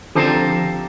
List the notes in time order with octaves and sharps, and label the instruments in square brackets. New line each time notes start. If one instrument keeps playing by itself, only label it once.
[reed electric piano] D3 C4 [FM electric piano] F3 [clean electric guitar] G4 F5 A5 [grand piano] A4 A#5